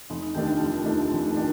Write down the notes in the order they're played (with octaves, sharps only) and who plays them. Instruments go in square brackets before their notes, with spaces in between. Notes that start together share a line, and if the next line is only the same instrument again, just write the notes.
[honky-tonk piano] F1 [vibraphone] D#4
[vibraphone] D#4
[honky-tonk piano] D#2 D#3 A3 D4 [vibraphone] G4
[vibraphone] G4
F4
[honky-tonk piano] F1 [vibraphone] D#4
[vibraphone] F4
[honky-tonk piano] D#2 D#3 A3 D4
F1
D#3 A3 D4